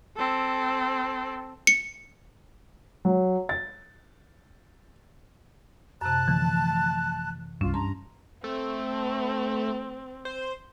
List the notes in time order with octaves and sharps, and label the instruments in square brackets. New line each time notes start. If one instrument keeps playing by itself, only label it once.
[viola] C4 A4
[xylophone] C#7
[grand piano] F#3
A6
[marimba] F#2 C3 [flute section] A5 F#6
[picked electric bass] D3 F3 A3 [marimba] E3
[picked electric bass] C2 G2 [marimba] C#4 [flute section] F4
[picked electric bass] G2 [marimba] A5 C6 [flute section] A#5
[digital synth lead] A3 [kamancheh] C4
[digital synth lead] C5